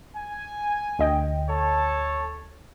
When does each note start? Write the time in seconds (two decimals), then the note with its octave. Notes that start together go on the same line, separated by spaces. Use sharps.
0.16 G#5
0.99 D2 D#5 G5
1.49 A4 C#5 A5